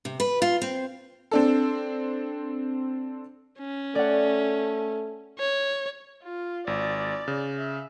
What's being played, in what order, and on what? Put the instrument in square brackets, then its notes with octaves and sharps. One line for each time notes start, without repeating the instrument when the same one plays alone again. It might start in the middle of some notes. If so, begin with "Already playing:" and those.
[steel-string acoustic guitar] C3
B4
F4
C4
[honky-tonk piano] C4 D4 A4
[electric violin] C#4
[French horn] A3 [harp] D5 F#5
[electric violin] C#5
[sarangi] F4
[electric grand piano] G#1 [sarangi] D5
[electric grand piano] C#3
[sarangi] E5